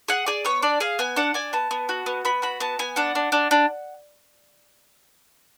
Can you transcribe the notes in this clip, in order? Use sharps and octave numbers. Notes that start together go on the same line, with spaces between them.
G#4 F#5
G#4 D5
B3 C#5
D4 D5
G#4 F5
B3 G#5
D4 F#5
D4 G#5
B3 A5
B3
F#4
B3
B3 B5
F#4 B5
B3 A5
B3 G#5
D4 F#5
D4
D4
D4